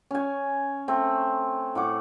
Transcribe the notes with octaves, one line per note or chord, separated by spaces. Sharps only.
C#4 G#5
A3 C4
A2 F#5 D6